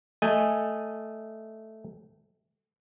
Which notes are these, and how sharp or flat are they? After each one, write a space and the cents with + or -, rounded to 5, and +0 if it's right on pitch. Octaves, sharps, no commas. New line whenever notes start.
A3 +0 D#5 +0 G#5 -10